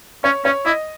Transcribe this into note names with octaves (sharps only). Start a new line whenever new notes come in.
C#4 C#5
C#4 C#5
E4 D#5